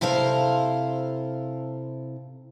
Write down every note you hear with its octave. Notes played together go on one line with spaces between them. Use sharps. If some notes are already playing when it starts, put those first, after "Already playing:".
C3 E4 A4 C5 F5